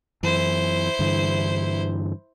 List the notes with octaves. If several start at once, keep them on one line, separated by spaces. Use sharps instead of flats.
F#2 E3 E4 C5
G2 D3 E3